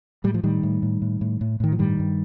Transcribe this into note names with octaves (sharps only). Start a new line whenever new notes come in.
A2 G3
F3
A2 D#3 G3
A2
A2
A2
A2
A2
A2 D#3
F3
G2 D#3 G3
G2